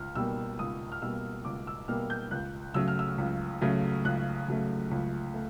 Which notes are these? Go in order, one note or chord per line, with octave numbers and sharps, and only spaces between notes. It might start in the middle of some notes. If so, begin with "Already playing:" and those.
Already playing: C#2 F6
B2 G3 A#3 E6
C#2 D#6
F6
B2 G3 A#3 E6
C#2 D6
E6
B2 G3 A#3 F6
G6
C#2 F#6
C#3 F#3 A3 E6
F6
E6
C#2
C#3 F#3 A3
C#2 F#6
C#3 F#3 A3
C#2
A3